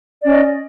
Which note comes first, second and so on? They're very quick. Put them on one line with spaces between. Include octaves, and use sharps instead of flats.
D5 C#4 D#5